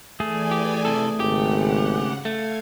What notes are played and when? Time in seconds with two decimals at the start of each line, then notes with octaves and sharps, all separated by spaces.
0.20 E3 A3 G#4 D5 G#5
0.51 G4
0.85 C3 A4
1.20 G#1 C#3 G4 F#5
2.25 A3 F5 G#6